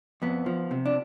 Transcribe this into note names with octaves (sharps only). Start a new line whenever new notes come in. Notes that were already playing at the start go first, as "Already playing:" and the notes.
F2 B3
F3
C3
D4